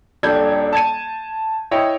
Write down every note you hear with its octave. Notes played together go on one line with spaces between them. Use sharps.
D#1 G3 D4 A4 G6 G#6
A5 G#6 D#7
E4 C#5 D#5 G5